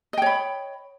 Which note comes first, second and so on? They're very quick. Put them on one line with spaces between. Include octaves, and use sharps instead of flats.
D#5 G5 C#5 B5